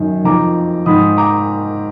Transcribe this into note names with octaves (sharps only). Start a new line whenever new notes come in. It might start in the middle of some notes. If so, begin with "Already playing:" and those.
Already playing: F#2 D#3
F2 D#3 A#5 D6
G#2 D#3 B5 D#6
A#5 D6